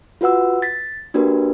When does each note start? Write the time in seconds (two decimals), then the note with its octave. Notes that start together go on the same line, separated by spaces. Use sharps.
0.21 F4 F#4 B4 F#5 E6
0.62 A6 B6
1.14 A#3 D4 F#4 G4 A#4 B4